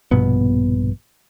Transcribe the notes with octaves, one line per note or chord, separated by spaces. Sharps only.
A#1 G2 B2 B3